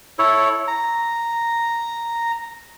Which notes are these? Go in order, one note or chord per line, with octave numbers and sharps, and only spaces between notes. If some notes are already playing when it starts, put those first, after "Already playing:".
E4 A4 C#5
A#5